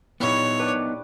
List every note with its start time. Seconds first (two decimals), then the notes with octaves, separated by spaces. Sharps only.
0.20 A#2 G3 B3 D#4 E4 C#5 C#6 G#6
0.59 D4 G4 B4 D5 D6